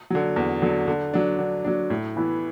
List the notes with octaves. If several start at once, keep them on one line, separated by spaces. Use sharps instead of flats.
D3 F#3
E2
D3 F#3
D3
F#3 D4
D3
F#3 D4
A2
E3 B3 E4